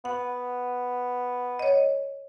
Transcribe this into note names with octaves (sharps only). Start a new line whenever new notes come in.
B3 F#5
C#5 D#5